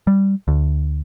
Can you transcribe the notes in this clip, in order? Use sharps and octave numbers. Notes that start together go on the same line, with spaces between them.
G3
D2